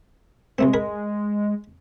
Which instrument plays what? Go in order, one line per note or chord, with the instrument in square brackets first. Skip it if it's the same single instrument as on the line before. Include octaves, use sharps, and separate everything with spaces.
[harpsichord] C2 A3 C4 [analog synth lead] G#3
[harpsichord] G#4 A#4 B5